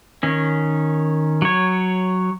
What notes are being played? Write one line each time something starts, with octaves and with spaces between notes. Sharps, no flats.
D#3 C#4
F#3 C#5